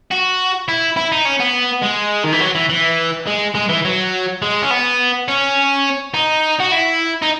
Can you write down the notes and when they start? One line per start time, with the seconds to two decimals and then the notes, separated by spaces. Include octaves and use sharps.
0.11 F#4
0.68 E4
0.97 E4
1.12 D#4
1.25 C#4
1.40 B3
1.83 G#3
2.24 D#3
2.33 E3
2.40 F#3
2.55 E3
2.69 E3
3.27 G#3
3.55 G#3
3.69 E3
3.85 F#3
4.42 G#3
4.62 C#4
4.70 B3
5.28 C#4
6.14 D#4
6.60 F#4
6.72 E4
7.22 D#4